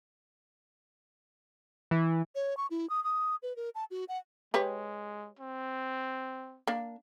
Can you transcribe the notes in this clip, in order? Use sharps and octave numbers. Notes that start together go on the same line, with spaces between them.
E3
C#5
C#6
E4
D#6
D#6
B4
A#4
A5
F#4
F#5
G#3 G4 B4 C#5
C4
A#3 D4